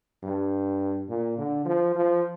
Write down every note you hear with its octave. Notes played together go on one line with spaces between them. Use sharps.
G2
A#2
D3
F3
F3